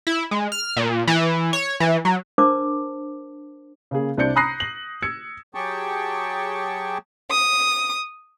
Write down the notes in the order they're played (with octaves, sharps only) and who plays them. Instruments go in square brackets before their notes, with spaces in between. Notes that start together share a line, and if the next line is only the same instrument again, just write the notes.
[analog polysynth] E4
G#3
F6
A#2
E3
C#5
E3
F#3
[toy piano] D4 A#4 C5 A5 D6
[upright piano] C#3 A#3 G#4
C2 C4 D4 D5 G6 C#7
A#5 B5 D#6 F#6 A#6 C7
F#7
E6 G#6 C#7
[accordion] F#3 G4 G#4 G5 A5 C#6
[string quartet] D#6